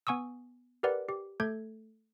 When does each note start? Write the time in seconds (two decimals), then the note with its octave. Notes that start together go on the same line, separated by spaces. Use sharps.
0.07 B3 G#5 C#6 D#6 E6
0.83 G4 A#4 B4 D5 F#5
1.09 G4
1.40 A3 A4 G6 G#6